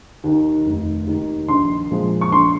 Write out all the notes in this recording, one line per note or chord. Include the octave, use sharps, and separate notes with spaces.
D#2 D#3
F1
D#2 D#3
A#1 C6
A#2 F3 G#3
C#6
A#1 C6